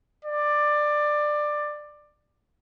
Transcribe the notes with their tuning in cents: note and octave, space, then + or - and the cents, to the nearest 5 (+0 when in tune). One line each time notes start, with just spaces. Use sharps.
D5 +15